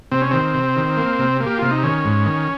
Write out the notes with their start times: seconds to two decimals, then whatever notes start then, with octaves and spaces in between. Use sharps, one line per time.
0.11 C3 C4
0.22 C#4
0.31 D#3 C4
0.54 C3
0.76 D#3
0.97 A#3
1.19 C3
1.40 A#3
1.46 G4
1.59 C3 F4
1.71 D#4
1.83 D#3 C#4
2.05 G#2
2.26 D#3